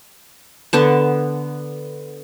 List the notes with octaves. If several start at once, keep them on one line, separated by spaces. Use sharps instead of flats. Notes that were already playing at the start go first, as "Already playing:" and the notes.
D3 B3 A5